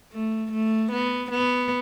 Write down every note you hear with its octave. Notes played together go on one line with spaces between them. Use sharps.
A3
A3
B3
B3